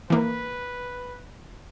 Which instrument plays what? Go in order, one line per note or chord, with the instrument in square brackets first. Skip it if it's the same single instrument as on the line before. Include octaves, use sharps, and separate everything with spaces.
[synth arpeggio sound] E3 A#3 [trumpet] B4